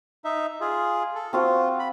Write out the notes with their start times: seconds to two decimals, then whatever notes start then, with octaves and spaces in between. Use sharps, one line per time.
0.24 D#4 E5
0.61 F4 G#4
1.15 A4
1.33 C4 F4 F#4 F5
1.79 B5